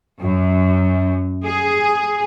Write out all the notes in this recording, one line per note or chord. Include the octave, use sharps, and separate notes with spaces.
F#2
G#4